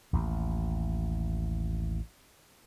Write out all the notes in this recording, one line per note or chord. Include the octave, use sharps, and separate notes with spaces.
A1 D#2